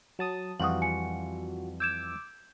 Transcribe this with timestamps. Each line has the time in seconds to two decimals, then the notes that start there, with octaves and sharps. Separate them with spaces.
0.19 F#3 A5 D#6
0.60 F2 E3 G3 F4 F#4 D#6 F#7
0.82 G#5 C#7
1.80 D6 E6 G6 G#6 E7